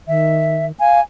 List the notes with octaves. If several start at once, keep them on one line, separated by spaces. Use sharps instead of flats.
D#3 E5
F5 G#5